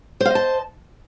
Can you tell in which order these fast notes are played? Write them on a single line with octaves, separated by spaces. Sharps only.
C5 F5 D#5 A5